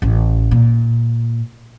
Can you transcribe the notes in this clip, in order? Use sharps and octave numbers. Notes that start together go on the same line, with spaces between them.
A1
A#2